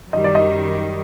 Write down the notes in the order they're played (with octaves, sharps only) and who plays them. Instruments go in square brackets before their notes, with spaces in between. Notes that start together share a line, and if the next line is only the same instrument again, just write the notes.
[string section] F#2 D#3 G3 [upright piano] D#5
[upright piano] D5
D#5